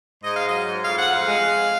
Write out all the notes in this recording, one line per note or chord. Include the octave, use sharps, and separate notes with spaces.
G#2 D#5
F5
F#3 D#5
G#2
F2 F5
F#5
F2
F5
G#3
F2